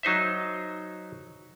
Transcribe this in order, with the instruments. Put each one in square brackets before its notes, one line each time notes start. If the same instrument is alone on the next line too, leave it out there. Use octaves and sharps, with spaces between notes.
[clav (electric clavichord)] F#3 D#4 C5 E5